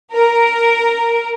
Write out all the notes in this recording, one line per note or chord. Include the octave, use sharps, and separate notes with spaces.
A#4